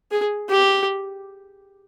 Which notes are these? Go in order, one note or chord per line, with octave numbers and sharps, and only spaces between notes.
G#4
G4